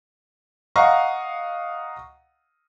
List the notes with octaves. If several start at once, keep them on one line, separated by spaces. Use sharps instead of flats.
D#5 F5 F#5 A#5 C#6